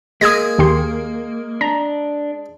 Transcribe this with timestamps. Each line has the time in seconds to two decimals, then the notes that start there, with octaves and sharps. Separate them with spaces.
0.21 G#3 A#3 G#4 D#6 G#6 A#6
0.58 D#2 G4 C6
1.61 D4 A#5